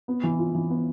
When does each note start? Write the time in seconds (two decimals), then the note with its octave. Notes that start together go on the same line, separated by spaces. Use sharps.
0.08 B3
0.23 E3
0.39 F4
0.54 E3
0.70 B3